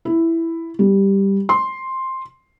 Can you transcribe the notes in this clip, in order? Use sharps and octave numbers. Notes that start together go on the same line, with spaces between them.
E4
G3
C6